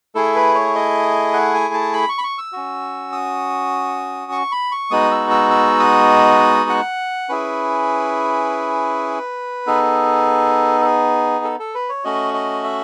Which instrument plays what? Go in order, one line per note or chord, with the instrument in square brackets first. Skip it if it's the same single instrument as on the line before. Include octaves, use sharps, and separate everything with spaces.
[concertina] A3 E4 G#4 A4
B4
C#5
D#5
F#5
G#5
A5
B5
C#6
B5
C#6
E6
C#4 F#4
D#6
C#6
B5
C#6
G#3 B3 D#4 F#4 D#6
E6
E6
E6
D#6
F#5
C#4 E4 G#4 B4
B3 D#4 G#4 A4
A4
G#4
A4
A4
B4
C#5
A3 C#4 F#4 D#5
D#5
E5